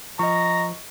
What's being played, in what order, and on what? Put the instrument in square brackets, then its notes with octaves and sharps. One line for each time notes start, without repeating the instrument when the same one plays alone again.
[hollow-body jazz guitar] F3 [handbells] D#5 C#6 [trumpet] A#5